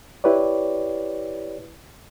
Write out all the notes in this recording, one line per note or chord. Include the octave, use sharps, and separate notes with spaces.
E4 G4 B4 C#5 D5